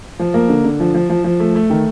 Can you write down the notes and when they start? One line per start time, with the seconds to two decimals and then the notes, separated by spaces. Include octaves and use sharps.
0.19 F3
0.34 A#3
0.49 D3
0.64 D3
0.80 F3
0.94 F3
1.10 F3
1.24 F3
1.40 A3
1.55 A3
1.70 D#3